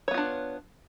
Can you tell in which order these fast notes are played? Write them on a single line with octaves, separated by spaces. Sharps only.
C#5 B3 F4 D4